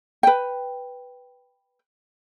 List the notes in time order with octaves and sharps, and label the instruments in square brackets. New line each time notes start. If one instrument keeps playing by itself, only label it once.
[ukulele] B4 G5